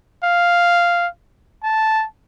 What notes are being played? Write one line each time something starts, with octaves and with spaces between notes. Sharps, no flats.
F5
A5